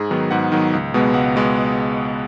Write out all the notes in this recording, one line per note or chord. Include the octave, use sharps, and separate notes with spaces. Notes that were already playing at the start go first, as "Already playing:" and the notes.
Already playing: G#2 G#4
D#3 F#3 B3
G#2 F#5
D#3 F#3 B3
C#2
B2 G#3 B3
C#2 F#5
B2 G#3 B3